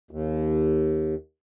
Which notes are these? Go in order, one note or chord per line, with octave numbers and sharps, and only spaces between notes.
D#2